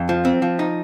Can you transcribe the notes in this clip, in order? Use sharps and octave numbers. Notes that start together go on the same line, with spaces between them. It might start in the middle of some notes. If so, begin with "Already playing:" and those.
Already playing: F2
F3
C4
F3
D#4